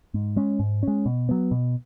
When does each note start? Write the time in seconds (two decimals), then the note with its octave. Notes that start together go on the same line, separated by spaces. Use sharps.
0.14 G#2
0.36 G#3 C#4
0.59 G#2
0.83 G#3 C#4
1.06 B2
1.29 F#3 B3
1.51 B2